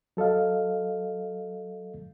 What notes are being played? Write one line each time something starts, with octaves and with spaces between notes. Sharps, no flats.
F#3 A4 D#5 F5